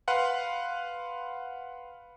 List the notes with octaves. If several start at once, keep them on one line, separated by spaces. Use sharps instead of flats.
B4 F5 F#5 C6